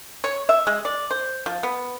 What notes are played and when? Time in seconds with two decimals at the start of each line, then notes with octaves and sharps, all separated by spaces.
0.24 C#5
0.49 E5
0.67 G#3
0.85 D5
1.11 C5
1.46 F3
1.63 B3